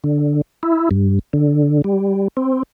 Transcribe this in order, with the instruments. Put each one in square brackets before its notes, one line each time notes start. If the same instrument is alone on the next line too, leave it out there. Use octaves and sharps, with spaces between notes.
[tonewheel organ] D3
E4
G2
D3
G3
C4